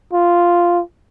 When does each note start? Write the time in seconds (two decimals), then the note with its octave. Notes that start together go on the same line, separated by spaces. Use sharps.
0.13 F4